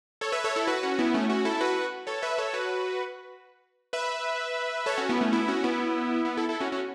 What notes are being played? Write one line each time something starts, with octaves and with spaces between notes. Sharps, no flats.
A4 C#5
B4 E5
A4 C#5
E4 A4
F#4 B4
C#4 F#4
B3 E4
A3 C#4
C#4 F#4
E4 A4
F#4 B4
A4 C#5
B4 E5
A4 C#5
F#4 B4
B4 E5
A4 C#5
C#4 F#4
B3 E4
A3 C#4
B3 E4
C#4 F#4
B3 E4
B3
E4 A4
E4 A4
C#4 F#4
C#4 F#4